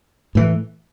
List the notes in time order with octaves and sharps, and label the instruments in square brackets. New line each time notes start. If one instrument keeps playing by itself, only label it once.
[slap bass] A2 E3